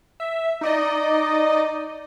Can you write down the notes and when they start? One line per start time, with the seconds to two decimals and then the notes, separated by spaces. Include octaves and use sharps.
0.20 E5
0.61 D#4 D5 D#5